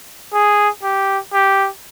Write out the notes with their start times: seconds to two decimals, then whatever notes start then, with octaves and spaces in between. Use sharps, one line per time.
0.34 G#4
0.84 G4
1.33 G4